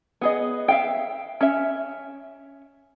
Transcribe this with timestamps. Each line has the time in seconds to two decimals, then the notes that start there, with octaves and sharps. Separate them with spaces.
0.21 B3 G#4 D#5
0.68 E5 F5 G5
1.41 C#4 E5